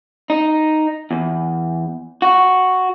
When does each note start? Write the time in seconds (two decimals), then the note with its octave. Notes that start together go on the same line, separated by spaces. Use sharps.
0.30 D#4
1.11 E2
2.22 F#4